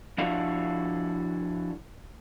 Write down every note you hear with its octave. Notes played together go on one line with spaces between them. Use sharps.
F3 D4 E4 F#4 A4 F5